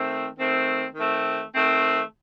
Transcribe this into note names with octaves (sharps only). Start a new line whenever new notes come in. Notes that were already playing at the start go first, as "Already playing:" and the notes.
Already playing: D#3 A3 C4
D#3 A3 C4
D#3 A3 C4
D#3 A3 C4